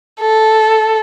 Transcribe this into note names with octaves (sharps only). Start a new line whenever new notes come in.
A4